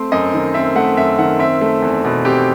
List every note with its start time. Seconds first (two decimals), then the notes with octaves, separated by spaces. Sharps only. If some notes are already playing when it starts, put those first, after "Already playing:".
Already playing: A3 C4 C5
0.12 F#2 D#5
0.34 D#3
0.54 C4 E5
0.76 A3 F#5
0.97 F#2 E5
1.19 D#3 F#5
1.39 C4 E5
1.61 A3
1.82 E2
2.04 B2
2.25 C4 G4